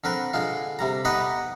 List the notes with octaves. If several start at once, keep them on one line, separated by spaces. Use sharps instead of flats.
D3 C4 A#4 B4
D3 G#3 F4
C3 G3 A#5
B3 D#4 G4 B4 D#5 F#5